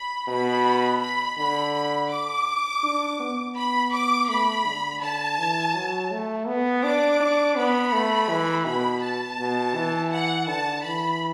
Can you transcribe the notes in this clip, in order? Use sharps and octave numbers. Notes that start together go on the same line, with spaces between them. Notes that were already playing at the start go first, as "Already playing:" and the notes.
Already playing: B5
B2 B5
B5
D3 B5
B5
D6
D4
B3
B5
D6
A3 B5
D3
D3 A5
E3
F#3
A3
B3
D4 D6
D4
B3 B5
A3
E3
B2 B5
A5
B2
E3
F#5
D3 A5
E3 B5